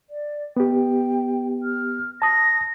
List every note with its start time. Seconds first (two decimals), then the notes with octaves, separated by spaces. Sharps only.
0.10 D5
0.57 B3 G4 G5
1.63 F6
2.22 A5 D#6 A#6